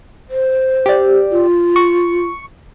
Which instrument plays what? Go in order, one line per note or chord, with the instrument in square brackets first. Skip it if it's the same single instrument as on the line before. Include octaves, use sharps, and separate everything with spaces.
[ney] C5
[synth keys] G4 D5
[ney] F4
[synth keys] C#6